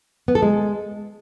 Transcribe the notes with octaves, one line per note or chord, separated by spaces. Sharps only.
B3
A4
G#3